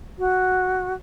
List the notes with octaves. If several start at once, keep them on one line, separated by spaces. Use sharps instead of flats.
F#4